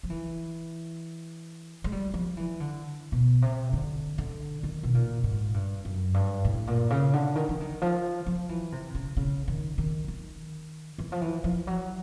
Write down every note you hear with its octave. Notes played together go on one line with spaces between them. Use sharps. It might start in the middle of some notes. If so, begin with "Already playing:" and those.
F3
E3
G#3
G3
F3
E3
D3
B2
C3
D3
D3
D#3
B2
A#2
G#2
G2
F#2
G2
A2
A#2
C#3
D3
D#3
E3
D#3
F3
F3
E3
C3
C#3
C#3
D#3
D#3
D#3
E3
F3
E3
F3
F#3